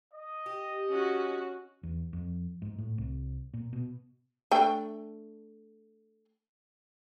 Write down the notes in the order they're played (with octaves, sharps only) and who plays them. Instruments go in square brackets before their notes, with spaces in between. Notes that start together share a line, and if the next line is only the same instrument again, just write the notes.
[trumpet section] D#5
[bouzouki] G4
[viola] C#4 F#4
[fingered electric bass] E2
F2
G#2
A2
C2
A#2
B2
[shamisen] A3 D4 G5